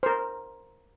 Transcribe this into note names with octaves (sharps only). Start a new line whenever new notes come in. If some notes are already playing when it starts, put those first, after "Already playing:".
A#4 C5